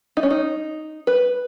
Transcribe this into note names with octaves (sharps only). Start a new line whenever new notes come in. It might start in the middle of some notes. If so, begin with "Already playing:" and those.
D#4
C#4
D#4
B4